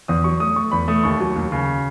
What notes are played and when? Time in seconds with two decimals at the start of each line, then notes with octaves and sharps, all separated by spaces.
0.08 E2 D#6
0.24 F#3 C#6
0.40 A3 D#6
0.56 A3 C#6
0.71 E2 B5
0.88 A3 D#6
1.03 D#2 C#6
1.20 F#3
1.36 D#2
1.52 C#3